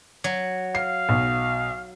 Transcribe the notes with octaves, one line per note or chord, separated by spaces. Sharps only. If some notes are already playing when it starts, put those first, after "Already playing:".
F#3
F5 C7
B1